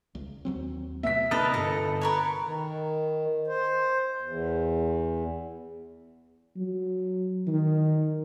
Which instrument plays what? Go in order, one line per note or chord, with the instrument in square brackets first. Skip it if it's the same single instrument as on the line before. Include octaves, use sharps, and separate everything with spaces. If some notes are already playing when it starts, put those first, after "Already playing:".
[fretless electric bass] C#2
D#2 F#3 C4
[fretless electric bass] B2 A3 B3 [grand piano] E5 B6
[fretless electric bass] C3 B3 D4 [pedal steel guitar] D#4 A#4 A5 [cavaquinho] B4 D#5
[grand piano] G1 [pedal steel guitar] A4 [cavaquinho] D#5
[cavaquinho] A#4 B4 C#5
[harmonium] D#3
C5
E2
[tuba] F#3
D#3